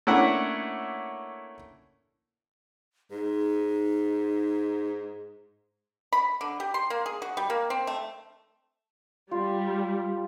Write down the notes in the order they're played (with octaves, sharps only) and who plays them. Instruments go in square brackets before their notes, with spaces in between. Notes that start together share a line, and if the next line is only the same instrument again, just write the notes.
[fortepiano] A3 A#3 C#4 D4 E4 F#5
[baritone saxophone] G#2 [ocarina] D#4
[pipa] B5
D3
G4
C6
A#3
G#4
F#4
G3
A#3
C4
A3
[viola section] G3 [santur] F4